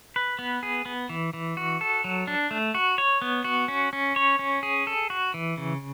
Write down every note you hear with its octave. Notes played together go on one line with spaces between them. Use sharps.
B4
B3
G#4
B3
E3
E3
F#4
A4
F#3
D4
A3
F#4
C#5
B3
F#4
C#4
C#4
C#5
C#4
G#4
A4
F#4
E3
C#3